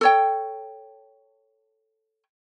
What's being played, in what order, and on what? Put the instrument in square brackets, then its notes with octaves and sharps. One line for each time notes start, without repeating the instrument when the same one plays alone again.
[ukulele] A4 C#5 G5